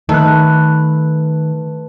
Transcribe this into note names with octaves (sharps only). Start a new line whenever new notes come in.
D#3 A3 B4 F#6